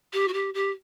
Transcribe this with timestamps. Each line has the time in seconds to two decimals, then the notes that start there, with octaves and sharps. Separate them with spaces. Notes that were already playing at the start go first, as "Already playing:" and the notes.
0.13 G4
0.28 F#4
0.33 G4
0.54 G4